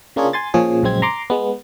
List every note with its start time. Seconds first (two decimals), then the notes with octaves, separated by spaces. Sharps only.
0.16 C#3 A#3 D4 F4 G#4 C#5
0.33 G#5 C6 A6
0.54 A#2 F3 C#4 G#4
0.83 A#1 F#2 C#3 G#3 C4 G#6
1.02 A#5 C6 D6
1.30 G#3 B3